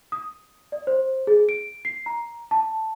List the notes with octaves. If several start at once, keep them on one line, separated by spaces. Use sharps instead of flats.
D#6
D5
C5
G#4
D7
C7
A#5
A5